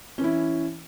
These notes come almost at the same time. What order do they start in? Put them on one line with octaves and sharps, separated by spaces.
C#4 E3 E4